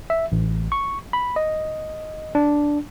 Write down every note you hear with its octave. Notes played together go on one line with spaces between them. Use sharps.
E5
A1
C#6
B5
D#5
D4